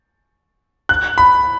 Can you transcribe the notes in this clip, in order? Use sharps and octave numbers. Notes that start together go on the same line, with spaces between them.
F#6
B5